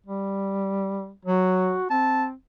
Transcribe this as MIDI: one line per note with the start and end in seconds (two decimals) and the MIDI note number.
0.06 1.12 55
1.25 1.76 54
1.25 1.88 66
1.90 2.33 60
1.90 2.25 81